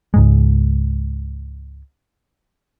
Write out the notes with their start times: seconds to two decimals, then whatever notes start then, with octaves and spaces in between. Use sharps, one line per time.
0.14 C#2 G#2 G#3